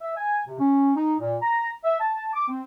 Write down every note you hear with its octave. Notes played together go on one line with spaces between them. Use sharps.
E5
G#5
C3
C#4
D#4
A#2
A#5
E5
A5
D6
C4